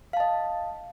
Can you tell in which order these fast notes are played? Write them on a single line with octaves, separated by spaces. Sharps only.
F5 A5 D#5